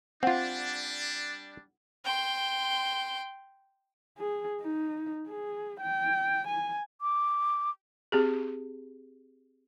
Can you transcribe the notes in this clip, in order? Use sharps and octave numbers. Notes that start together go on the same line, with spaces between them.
G3 C4 D4 F4 F#5
G5 C6
G#4
D#4
G#4
G5
G#5
D6
C4 G4 G#4